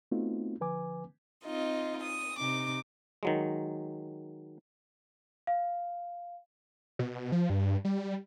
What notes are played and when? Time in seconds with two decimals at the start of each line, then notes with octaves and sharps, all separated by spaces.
0.12 A3 B3 C4 D#4 F4 F#4
0.60 D3 F3 B4 G#5 D6
1.44 C4 D#4 F4 D#5
2.03 D#6
2.38 C3 D#4 D6
3.23 D#3 F#3 G#3
5.47 F5
6.99 B2
7.32 F3
7.50 G2
7.85 G3